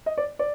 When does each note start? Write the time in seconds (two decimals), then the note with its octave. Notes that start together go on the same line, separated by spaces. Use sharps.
0.06 D#5
0.18 D5
0.39 D5